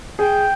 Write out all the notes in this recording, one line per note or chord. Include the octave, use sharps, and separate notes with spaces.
G#4 G5